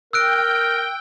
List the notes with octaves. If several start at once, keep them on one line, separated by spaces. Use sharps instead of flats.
A#4 G5 E6 F#6 D7